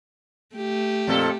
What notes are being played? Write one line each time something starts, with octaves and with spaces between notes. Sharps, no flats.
A3 G4
F2 A#2 A4